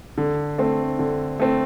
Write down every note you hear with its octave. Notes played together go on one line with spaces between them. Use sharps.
D3
A3 C4
D3
A3 C4